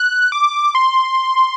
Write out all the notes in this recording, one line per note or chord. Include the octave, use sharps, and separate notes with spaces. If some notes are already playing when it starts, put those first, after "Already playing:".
Already playing: F#6
D6
C6